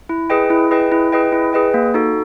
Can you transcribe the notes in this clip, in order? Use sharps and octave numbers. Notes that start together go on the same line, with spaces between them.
E4
G#4 B4 D#5 G5
E4
G#4 B4 D#5 G5
E4
G#4 B4 D#5 G5
E4
G#4 B4 D#5 G5
A#3
D#4 F#4 A4